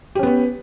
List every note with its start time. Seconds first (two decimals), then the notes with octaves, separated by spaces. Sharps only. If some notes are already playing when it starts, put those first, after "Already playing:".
0.15 G4
0.19 C#4
0.23 B3
0.27 B4